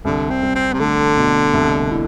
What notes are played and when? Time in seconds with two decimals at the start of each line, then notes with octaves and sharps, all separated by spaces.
0.05 C2 D3
0.30 C4
0.43 C2
0.55 C4
0.73 C3
0.79 D3 A3
1.17 B2
1.54 C2
1.91 E4